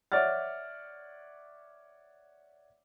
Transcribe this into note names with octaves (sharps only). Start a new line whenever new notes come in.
C#5 D5 E5 F#5 F6 A6